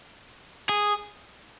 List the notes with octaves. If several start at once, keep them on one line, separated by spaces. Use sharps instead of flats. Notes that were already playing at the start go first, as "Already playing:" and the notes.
G#4